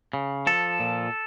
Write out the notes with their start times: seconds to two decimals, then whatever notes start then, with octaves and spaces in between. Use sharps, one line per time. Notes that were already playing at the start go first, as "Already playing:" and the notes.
0.13 C#3
0.47 F3 A4
0.80 A#2